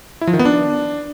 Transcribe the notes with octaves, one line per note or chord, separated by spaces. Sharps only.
E4
F3
D#3
B3
D4